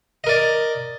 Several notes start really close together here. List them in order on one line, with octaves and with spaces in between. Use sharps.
D#5 A#4 D5